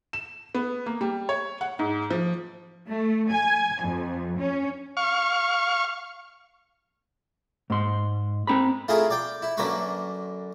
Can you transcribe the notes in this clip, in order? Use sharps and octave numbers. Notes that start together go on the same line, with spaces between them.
E7
B3
A#3
G3
C#5
F#5
G#2
F3
A3
G#5
F2
C#4
F5 C#6
G#2 C6
C4 A#5 B5
A3 E4 F4 G#4 A#4
D5 G5
E4
F#2 D3 A#3 B4 B5 C#6